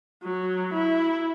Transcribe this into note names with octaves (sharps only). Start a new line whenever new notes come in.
F#3
E4